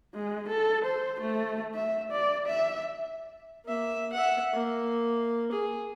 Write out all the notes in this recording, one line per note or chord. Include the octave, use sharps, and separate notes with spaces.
G#3
A4
C5
A3
E5
D5
E5
A#3 E5
E5 F#5
A#3
G#4